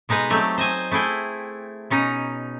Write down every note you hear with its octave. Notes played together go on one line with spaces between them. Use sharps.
B2 G#3 D#4 B4 A#5
F#3 A3 C4 G4
C5 D#5 G#5
A3 E4 G#4 G5
B2 C#4 D#4 A#5